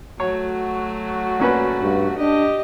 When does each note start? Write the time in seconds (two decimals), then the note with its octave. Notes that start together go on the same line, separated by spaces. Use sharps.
0.20 F#3 A3 F#4 C#5
1.39 A#2 C#4 B4
1.82 G2
2.19 D4 G4 D#5